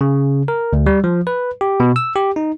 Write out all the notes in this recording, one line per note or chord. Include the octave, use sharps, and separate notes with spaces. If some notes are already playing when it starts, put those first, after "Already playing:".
C#3
A#4
D2
G3
F3
B4
G4
B2
E6
G4
D#4